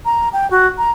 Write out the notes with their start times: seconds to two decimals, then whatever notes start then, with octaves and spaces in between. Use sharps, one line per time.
0.05 A#5
0.33 G5
0.51 F#4
0.78 A#5